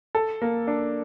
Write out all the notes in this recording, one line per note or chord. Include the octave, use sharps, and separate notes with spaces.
A4
A#3
D4